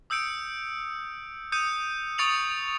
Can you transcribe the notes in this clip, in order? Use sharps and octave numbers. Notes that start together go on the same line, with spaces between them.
D#6 E6 G6 C#7 D7
D#6 G6 C#7 D#7
C#6 D#6 A6 C#7 F7 F#7